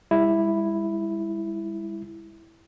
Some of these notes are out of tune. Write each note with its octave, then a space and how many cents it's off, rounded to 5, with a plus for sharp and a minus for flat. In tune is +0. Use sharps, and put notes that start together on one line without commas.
G3 +45 E4 +0